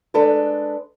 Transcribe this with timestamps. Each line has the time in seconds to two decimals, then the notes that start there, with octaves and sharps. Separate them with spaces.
0.14 G#3 D4 A4 B4